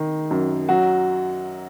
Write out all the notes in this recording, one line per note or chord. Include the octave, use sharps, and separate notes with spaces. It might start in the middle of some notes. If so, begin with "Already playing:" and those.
Already playing: D#3 D#4
F#2
F#3 F#4